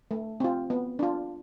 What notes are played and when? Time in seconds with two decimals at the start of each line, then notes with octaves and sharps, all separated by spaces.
0.11 A3
0.40 C4 F4
0.70 B3
0.99 D4 F4